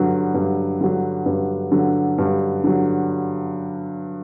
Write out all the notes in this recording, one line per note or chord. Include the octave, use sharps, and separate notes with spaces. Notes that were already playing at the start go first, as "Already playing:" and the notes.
Already playing: G2 D3 F#3
G2
D3 F#3
G2
D3 F#3
G2
D3 F#3